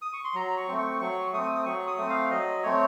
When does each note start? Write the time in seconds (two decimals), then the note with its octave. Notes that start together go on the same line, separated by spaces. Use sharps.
0.02 D#6
0.13 C#6
0.24 C6
0.34 F#3 A#5
0.57 C#6
0.68 A3 C4
0.78 C#6
1.00 F#3 C#6
1.27 C#6
1.32 A3 C4 D#6
1.55 D#6
1.65 F#3 C#6
1.87 D#6
1.98 A3 C4
2.09 F5
2.31 F#3 D#5
2.63 A3 C4 C#5